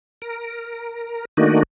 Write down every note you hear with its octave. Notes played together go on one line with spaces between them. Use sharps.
A#4
D#3 A3 A#3 D4 D#4 F#4